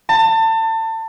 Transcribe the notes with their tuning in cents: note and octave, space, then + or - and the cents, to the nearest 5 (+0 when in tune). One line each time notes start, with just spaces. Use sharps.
A5 +30